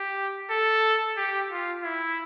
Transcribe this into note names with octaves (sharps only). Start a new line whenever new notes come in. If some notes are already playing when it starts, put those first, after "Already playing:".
Already playing: G4
A4
G4
F4
E4